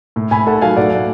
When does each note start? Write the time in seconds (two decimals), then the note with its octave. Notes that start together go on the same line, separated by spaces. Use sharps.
0.16 A2
0.31 A2 G#5 B5
0.47 A3 F#5 A5
0.61 F#3 F5 G#5
0.77 A2 D5 F#5
0.92 A2